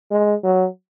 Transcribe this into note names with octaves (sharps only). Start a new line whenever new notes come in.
G#3
F#3